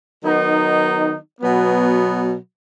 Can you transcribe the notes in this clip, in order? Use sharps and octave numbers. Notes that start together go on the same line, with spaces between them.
D#3 F#3 B3 D#4
B2 F#3 B3